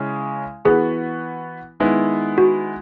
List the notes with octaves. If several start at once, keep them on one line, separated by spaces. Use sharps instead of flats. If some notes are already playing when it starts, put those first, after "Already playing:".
Already playing: C#3 G#3 C#4 E4
E3 B3 F#4 G#4 B4
D#3 G#3 B3 E4
F#4